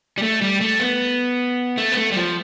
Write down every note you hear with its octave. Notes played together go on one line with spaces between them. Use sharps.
G3
A3
G3
A3
B3
A3
B3
A3
G3
F3